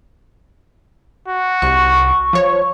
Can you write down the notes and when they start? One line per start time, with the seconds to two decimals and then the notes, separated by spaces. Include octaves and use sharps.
1.28 F#4
1.62 C2 C#6
2.33 F3 C#5